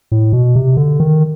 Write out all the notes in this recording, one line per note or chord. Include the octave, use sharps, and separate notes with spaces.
A2
B2
C3
D3
D#3